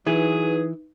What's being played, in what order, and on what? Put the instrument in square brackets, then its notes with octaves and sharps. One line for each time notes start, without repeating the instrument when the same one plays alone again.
[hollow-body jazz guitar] E3 [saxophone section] F#3 G#4 [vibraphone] D#4 B4